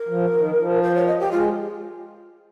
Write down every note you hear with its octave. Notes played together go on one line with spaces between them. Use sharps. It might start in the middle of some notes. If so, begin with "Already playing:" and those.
Already playing: A#4
F3
D#3
F3
C5
C#5
D#5
G4
G#3 F4